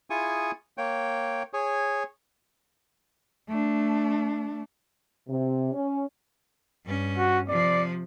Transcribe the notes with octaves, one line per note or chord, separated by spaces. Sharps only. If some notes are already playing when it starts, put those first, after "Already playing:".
E4 F4 G#4 G#5 C#6 D#6
A#3 C#5 G5
G#4 C#5
A3 D4
C3
C#4
G2 C#4
F#4
C3 F3 D5